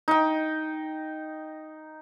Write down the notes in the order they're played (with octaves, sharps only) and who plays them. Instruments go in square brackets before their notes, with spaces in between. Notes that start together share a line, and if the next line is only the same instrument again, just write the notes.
[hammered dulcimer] D#4 G5